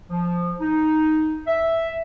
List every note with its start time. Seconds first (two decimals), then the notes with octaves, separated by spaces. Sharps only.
0.10 F3
0.60 D#4
1.47 E5